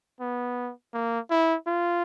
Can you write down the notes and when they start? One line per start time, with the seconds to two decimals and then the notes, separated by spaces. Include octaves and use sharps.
0.20 B3
0.94 A#3
1.30 E4
1.67 F4